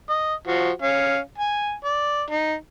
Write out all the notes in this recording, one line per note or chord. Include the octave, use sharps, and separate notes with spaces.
D#5
F3 F#4
C#4 F5
G#5
D5
D#4